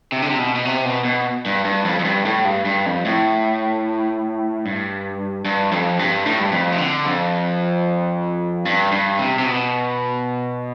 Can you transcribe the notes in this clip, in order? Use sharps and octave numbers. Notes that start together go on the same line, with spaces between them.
C3
D3
C3
B2
B2
C3
B2
B2
G2
G2
F2
F2
G2
A2
G2
G2
F2
A2
G2
G2
F2
G2
A2
G2
F2
C3
D3
F2
G2
G2
C3
C3
B2